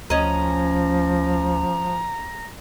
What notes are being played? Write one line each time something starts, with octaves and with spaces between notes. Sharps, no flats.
D2 F3 C#4 D#5 A#5